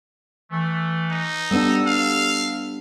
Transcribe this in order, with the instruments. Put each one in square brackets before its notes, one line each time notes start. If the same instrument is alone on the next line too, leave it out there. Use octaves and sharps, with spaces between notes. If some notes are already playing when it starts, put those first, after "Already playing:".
[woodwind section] E3 A3
[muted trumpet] D#4
[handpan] G3 B3 D4 [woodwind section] A4 E6
[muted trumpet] F5